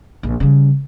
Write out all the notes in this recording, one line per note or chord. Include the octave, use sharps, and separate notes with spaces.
A#1
C#3 G3